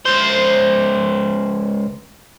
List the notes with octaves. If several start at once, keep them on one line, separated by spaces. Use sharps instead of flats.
C#2 C5